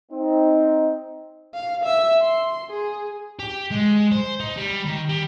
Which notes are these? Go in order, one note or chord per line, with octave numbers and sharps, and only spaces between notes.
C4 D#4
F5
E5 E6
C6
G#4
G4
G#3
C5
D#4
G3
D#3
G3